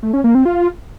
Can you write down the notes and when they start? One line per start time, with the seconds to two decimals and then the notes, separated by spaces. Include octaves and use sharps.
0.03 A3
0.13 C#4
0.24 A#3
0.35 C4
0.45 F4